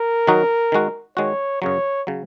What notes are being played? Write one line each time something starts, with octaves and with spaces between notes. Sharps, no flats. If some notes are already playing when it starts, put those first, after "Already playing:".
Already playing: A#4
D#3 F#3 D#4 F#4
D#3 G#3 F#4
D#3 G#3 F#4 C#5
F#2 C#3 F#3 C#5
C#3 F#3